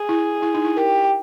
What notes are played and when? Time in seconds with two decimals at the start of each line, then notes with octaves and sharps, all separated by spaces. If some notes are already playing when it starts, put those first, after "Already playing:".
Already playing: G#4
0.09 E4
0.42 E4
0.54 D#4
0.65 E4
0.76 G4 A#4